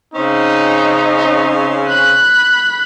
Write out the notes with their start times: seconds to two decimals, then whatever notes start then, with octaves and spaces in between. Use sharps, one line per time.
0.14 C#3 C4 C#4 D#4
1.89 B5 F#6